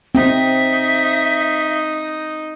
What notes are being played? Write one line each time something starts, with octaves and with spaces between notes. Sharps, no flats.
C4 D#4 E5